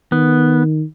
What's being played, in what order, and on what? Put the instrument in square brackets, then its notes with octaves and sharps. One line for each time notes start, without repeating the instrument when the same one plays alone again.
[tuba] D#3 [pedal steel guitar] B3